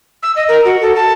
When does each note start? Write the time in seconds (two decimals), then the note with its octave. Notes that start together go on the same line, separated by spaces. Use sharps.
0.23 E6
0.36 D#5
0.49 A#4
0.65 F#4
0.82 A4
0.96 A5